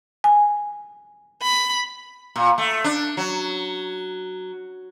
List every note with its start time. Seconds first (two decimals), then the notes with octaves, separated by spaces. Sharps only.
0.24 G#5
1.42 B5
2.36 A#2
2.58 A3
2.84 D4
3.17 F#3